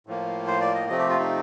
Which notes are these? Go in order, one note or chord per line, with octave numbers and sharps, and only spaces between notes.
A2 F3 A#3
C5
D5
D#5
C3 F3 A3 C4 D#5
G4
F4
D#4